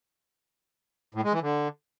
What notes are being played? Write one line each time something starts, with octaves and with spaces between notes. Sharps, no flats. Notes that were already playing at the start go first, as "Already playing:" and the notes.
A2
G#3
E3
D3